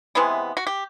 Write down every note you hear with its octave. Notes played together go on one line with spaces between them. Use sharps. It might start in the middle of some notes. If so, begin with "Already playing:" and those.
C3 E3 G#3 B3
F#4
G4